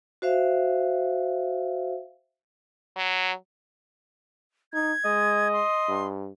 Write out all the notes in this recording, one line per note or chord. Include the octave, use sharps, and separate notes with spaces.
F#4 C5 E5 F5
F#3
D#4 G#6
G#3 D#5
C6
G2